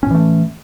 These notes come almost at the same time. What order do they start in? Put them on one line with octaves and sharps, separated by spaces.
C#4 A2 E3 A3